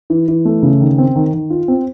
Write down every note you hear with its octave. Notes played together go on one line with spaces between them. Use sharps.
E3
E3
A3
C#3
D#3
C4
D#3
D#3
F4
C4